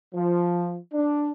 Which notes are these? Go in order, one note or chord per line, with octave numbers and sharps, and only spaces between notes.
F3
D4